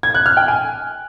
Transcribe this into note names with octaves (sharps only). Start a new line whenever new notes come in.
G#6
F#6
F6
G5
G#5